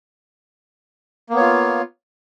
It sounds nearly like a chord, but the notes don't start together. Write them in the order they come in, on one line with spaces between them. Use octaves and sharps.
A#3 B3 C#5 F4